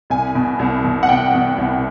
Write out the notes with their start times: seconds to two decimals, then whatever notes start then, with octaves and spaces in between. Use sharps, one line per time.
0.10 C2 G#5
0.35 B2
0.59 C2
0.84 B2
1.03 F#5
1.09 C2 G5
1.34 B2
1.58 C2